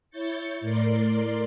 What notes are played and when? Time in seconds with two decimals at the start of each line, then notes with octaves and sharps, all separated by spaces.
0.10 E4 C#5 G6 A6 C#7
0.61 A2 A#4 D5 C6